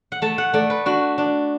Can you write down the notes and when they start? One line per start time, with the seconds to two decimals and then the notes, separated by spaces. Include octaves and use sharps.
0.12 F#5
0.22 A3 A5
0.38 F#5
0.53 A3 D5
0.70 B4
0.86 D4 F#4
1.18 D4